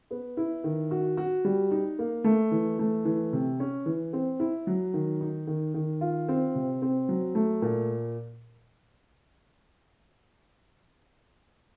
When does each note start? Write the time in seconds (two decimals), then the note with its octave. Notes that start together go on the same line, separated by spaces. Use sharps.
0.11 B3
0.37 E4
0.64 D#3
0.91 F#4
1.17 F#4
1.45 G3
1.71 D#4
1.99 A#3
2.24 A3
2.51 E3
2.79 A3
3.05 E3
3.33 C3
3.60 C#4
3.86 E3
4.13 C4
4.40 E4
4.67 F#3
4.94 D#3
5.21 D#4
5.47 D#3
5.74 D#3
6.01 F4
6.28 C4
6.55 C3
6.82 C4
7.09 F#3
7.35 A3
7.62 A#2